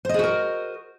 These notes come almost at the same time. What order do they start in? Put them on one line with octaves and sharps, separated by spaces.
C5 D#5 G#4 F#4 A#4